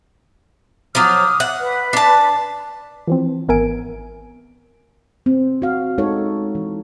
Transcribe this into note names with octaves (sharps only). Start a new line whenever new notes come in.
F3 F#3 D6 D#6 F6
F#5
B4
D4 A5
E3 F3 C4
G#1 B3 A#4 E5 G#5 D7
C4
F#4 F5
G#3 D#4 A4 C#5
E3